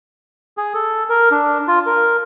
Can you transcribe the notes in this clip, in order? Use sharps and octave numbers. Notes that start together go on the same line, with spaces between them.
G#4
A4
A#4
D4
F4
A#4